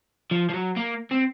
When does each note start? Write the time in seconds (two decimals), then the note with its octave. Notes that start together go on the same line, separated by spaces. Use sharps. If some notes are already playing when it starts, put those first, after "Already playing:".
0.31 F3
0.49 F3
0.54 F#3
0.76 A#3
1.11 C4